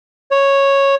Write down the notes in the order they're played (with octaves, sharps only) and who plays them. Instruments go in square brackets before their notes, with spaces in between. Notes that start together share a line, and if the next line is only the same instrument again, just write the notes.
[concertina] C#5